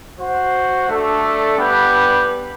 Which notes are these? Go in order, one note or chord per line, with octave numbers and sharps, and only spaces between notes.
F#4 C5 F#5
A3 D4 A4
G3 B3 D4 G4 B4